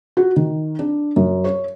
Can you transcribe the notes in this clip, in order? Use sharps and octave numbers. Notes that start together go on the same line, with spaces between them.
F#4
D#3
D4
F#2
C#5